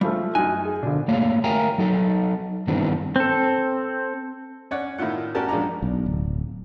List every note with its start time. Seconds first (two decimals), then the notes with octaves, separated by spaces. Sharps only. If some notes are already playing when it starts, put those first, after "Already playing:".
0.01 C#3 F3 G3 A3
0.35 F#2 D#4 G#5 F#6
0.66 G#4
0.83 A#1 B2 D3 D4
1.08 A3 A#3 C#5 F5
1.44 A#4 E5 F5 G5 G#5 A#5
1.78 F#3 D#4 A4
2.67 G2 D#3 E3 B3 C4 D4
3.16 C4 A4
4.71 C#4 C#5 D5 F#5
4.99 A2 D#3 E4 F4 F#5
5.35 C#4 F#4 G4 A#4 D5 A5
5.49 A#1 G#3 D4 D5 A#5
5.82 B1
6.06 D1